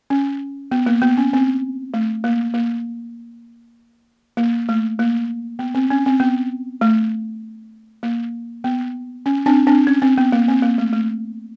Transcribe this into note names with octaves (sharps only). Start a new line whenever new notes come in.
C#4
B3
A#3
B3
C#4
C4
A3
A#3
A#3
A#3
A3
A#3
B3
C4
C#4
C4
B3
A3
A#3
B3
C#4
C4 D4
C4 D4
C#4
C4
B3
A#3
C4
A#3
A3
A3